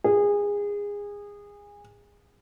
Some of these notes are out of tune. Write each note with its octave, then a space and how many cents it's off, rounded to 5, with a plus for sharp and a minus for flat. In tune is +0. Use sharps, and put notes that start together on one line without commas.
G#4 -25